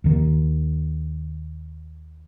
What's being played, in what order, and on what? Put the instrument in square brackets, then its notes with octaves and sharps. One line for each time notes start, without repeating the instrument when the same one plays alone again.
[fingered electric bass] D#2 D#3